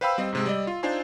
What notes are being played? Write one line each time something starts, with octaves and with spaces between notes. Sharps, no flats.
B4 C5 F5 G5 B5 E6
G3 C4 D#5
G#2 C3 G#3
G3 D5 D#5
F4
D4 D#4 F4 C5 G#5 C6